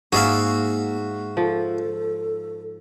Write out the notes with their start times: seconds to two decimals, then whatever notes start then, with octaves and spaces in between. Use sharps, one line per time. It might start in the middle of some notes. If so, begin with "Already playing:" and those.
0.12 G#2 A#3 F#4 G#4 D5 E5 F5
1.37 F3 A4